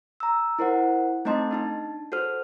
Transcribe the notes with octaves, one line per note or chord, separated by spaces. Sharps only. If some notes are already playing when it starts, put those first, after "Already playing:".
A#5 E6
E4 A#4 C5 F#5
A3 C4 D#4 D#5 A5 C6
D4 D#4 A5
F#4 A4 C5 F6